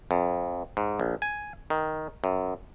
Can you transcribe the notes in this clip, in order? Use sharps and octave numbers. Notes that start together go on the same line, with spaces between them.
F2
G#2
A#1
G#5
D#3
F#2